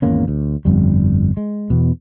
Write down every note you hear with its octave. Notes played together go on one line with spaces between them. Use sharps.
G#1 E2 A#3 C#4
D2
G1 F2 G3
G#3
E2 B2